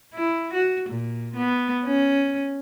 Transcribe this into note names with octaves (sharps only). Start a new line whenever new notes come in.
E4
F#4
A#2
B3
C#4